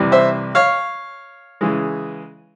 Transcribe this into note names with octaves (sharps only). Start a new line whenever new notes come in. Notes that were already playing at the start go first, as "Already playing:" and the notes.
Already playing: C2 C3 E3 G3
C5 E5
C#5 F5
C#3 E3 G#3